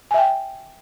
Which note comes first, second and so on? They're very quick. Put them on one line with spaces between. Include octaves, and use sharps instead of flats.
G#5 E5 G5